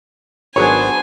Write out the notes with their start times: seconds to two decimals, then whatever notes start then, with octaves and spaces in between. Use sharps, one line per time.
0.56 G#1 F#3 B3 D4 G#4 C5 C#5 G#5